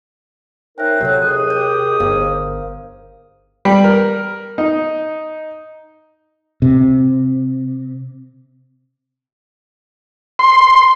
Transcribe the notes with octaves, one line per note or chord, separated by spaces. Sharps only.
C#4 D#4 A#4 C5 E5 G5 F#6
C3 F#3 G4 A4
D#2 G#4 D#6
G4 G6
G1 A#4 C5 F5
G3
A#4
D#4
C3
C6